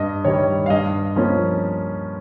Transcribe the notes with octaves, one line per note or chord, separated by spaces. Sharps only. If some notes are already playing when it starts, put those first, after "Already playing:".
Already playing: G2 D#5
D#3 G3 C#5
F5
G2 D#5
F3 A#3 C#4